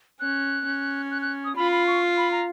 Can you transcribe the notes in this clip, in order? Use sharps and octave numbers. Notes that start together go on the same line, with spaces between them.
C#4 F#6
C#4
F#6
F#6
D#6
F4 B5
B5
C#6
B5
A#5